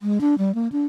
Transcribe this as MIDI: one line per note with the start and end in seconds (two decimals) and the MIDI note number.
0.01 0.18 56
0.21 0.35 62
0.38 0.54 55
0.55 0.68 58
0.72 0.85 62